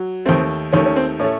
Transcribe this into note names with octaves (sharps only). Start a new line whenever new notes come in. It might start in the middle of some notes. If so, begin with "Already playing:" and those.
Already playing: F#3
D#2 D#3 A3 C4
D#2 D#3 A3 C#4
C#4
C4
A2 A3 C#4